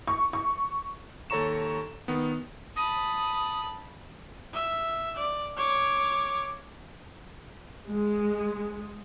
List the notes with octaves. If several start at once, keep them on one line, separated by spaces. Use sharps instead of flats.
C#6
C#6
D#2 A4 C#5 A#5 C#6 E7
D#3 B3
A5 B5 D#6
E5
D5
C#5 D6
G#3